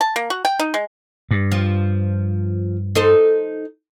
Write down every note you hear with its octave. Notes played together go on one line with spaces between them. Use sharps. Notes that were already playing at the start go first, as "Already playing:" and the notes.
A5
A#3
F#4
G5
D#4
G#3
G2
F3
D#4 A4 C5